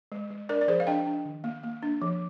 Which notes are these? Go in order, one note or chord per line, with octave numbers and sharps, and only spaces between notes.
G#3
G#3
D4 A#4 D5
D5
F3 G#4 C5
F5
D4 D#5 G5
D4
D#3
A#3
A#3
D4
F3